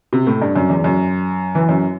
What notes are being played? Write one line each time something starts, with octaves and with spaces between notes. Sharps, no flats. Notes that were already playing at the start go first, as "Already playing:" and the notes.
C3
A2
G2
F#2
E2
F#2
E3
F#2